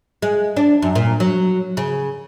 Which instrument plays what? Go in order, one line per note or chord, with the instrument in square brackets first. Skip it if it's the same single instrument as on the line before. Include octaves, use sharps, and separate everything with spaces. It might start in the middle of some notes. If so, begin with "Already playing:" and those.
[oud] G#3
D4
F#2
A#2
F#3
C#3